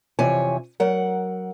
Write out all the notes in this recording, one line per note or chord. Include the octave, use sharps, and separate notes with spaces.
F2 C3 E3 C#5 G#5
F#3 A#4 F#5